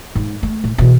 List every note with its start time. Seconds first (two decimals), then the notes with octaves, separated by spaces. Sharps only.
0.15 G#2
0.43 A3
0.64 A2
0.78 B2 E3